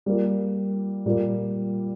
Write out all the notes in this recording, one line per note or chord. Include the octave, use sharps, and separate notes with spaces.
G3 A#3 F4
A#2 G3 A#3